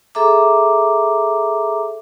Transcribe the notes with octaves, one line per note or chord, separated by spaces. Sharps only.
G#4 A4 E5 A#5 D6